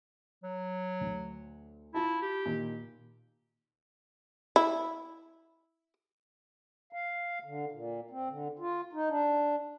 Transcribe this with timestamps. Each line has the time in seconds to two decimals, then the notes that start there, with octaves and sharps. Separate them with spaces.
0.44 F#3
1.01 D2
1.94 E4 F4 A5
2.22 G4
2.46 A#2 D#3
4.56 E4
6.93 F5
7.44 D3
7.72 A#2
8.10 C4
8.29 D3
8.59 F4
8.93 D#4
9.10 D4